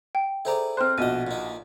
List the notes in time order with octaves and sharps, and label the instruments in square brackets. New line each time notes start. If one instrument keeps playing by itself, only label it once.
[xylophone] G5
[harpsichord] E4 G#4 D5 [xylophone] A4 C5 A#5
[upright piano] C4 C5 [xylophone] F6 F#6
[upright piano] A#1 F#4 [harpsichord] B2 D#5 [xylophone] D#7
[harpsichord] A#2 D#4